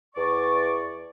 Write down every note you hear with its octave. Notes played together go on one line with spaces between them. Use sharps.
E2 D5 C#6